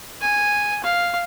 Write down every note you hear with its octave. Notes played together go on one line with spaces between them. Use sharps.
G#5
F5